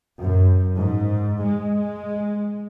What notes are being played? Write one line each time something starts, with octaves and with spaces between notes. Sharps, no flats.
F#2
G#2
G#3